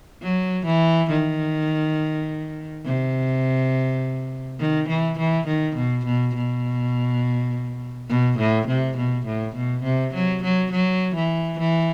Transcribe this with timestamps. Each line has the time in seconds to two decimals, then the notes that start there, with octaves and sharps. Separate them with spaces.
0.23 F#3
0.66 E3
1.10 D#3
2.86 C3
4.60 D#3
4.89 E3
5.18 E3
5.47 D#3
5.76 B2
6.05 B2
6.35 B2
8.09 B2
8.38 A2
8.68 C3
8.97 B2
9.26 A2
9.56 B2
9.84 C3
10.14 F#3
10.43 F#3
10.71 F#3
11.15 E3
11.59 E3